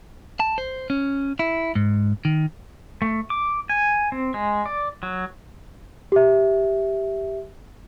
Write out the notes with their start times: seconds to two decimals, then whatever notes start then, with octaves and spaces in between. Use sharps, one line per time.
0.40 A5
0.58 C5
0.90 C#4
1.39 E4
1.75 G#2
2.25 D#3
3.02 A3
3.30 D6
3.70 G#5
4.12 C4
4.34 G#3
4.66 D5
5.03 F#3
6.12 G4 E5